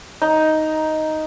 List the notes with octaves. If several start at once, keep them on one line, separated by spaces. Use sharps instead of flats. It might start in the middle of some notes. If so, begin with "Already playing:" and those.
D#4